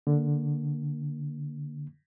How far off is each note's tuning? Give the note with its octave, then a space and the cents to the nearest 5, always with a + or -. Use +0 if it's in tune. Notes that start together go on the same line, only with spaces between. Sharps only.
D3 +0 A#3 +0